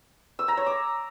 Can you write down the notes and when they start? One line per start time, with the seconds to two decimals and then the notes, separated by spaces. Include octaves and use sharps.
0.39 E6
0.48 A#5
0.57 C#5
0.66 D6